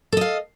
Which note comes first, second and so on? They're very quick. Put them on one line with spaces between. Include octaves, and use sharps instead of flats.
A4 D#5 F5